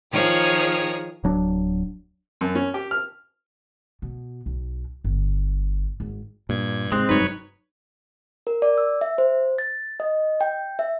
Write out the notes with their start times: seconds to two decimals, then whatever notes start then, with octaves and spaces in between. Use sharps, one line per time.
0.12 D#3 F3 G#4 C#5 G5 A#5
1.24 D1 F#3 D4
2.41 F#2
2.55 C#4
2.74 G4
2.91 F6
4.02 B2
4.46 B1
5.04 G1
6.00 G#1
6.49 G2 A#2 G#6
6.92 G#2 C3 G#3 C4 F#6
7.09 F1 G2 F#3 D#4 B4 C#5
8.47 A#4
8.62 D5
8.78 E6
9.01 E5
9.18 C5
9.58 A6
10.00 D#5
10.41 G5
10.79 E5